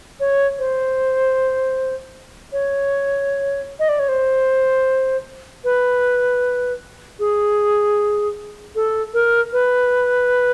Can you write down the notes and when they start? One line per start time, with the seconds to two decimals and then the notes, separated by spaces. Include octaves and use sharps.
0.20 C#5
0.59 C5
2.52 C#5
3.79 D#5
3.89 D5
3.99 C#5
4.09 C5
5.64 B4
7.19 G#4
8.75 A4
9.14 A#4
9.53 B4